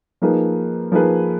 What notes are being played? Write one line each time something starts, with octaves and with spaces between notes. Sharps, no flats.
F3 A#3 D#4 G#4 B4
F3 A#3 D#4 G#4 B4